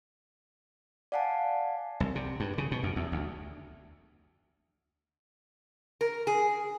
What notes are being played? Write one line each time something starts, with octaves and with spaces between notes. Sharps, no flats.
D5 F5 F#5 G#5 A5
C2
C3
G2
C#3
B2
F#2
E2
D2
A#4
G#4